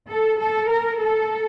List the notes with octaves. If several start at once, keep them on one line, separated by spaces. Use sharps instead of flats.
A4
A4
A#4
A4